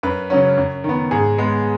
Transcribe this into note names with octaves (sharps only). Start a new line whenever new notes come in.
F#2 B4
C#3 F#3 C#4
F#2
D#3
B3
G#2 G#4
G#3 B3